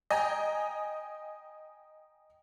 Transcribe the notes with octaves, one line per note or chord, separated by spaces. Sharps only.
D#5 G5 G#5 A#5